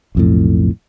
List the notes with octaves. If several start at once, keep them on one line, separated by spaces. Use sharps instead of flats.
B1 F2 A2